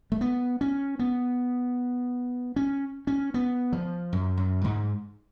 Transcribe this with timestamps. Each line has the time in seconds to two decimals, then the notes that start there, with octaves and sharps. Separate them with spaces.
0.12 A3
0.21 B3
0.61 C#4
0.99 B3
2.56 C#4
3.07 C#4
3.34 B3
3.73 F3
4.13 F#2
4.37 F#2
4.64 G#2